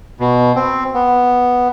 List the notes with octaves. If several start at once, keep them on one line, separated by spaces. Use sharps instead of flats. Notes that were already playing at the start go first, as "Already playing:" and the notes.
B2
C4
B3